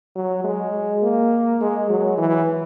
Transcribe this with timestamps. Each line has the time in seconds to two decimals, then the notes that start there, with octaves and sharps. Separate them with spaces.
0.15 F#3
0.44 G#3
1.02 A#3
1.61 G#3
1.90 F#3
2.17 E3